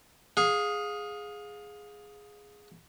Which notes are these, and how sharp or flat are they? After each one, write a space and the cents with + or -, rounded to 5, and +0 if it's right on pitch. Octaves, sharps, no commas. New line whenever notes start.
G#4 +0 F5 +30